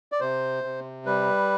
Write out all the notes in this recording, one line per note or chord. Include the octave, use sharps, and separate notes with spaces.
D5
C3 C5
C3
G3 B4